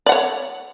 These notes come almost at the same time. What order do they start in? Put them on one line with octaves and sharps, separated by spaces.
D5 F#5 C#5